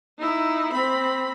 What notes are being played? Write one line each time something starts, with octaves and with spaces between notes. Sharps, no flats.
D#4 E4
C4 B5